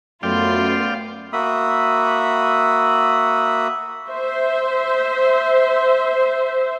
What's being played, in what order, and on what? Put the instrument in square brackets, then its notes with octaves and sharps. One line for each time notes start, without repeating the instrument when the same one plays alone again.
[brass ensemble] F#2 A3 [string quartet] B3 F4 C6 [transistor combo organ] D5 F5 G5
[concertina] A#3 F#4 E5 B5 D#6
[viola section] C5 E5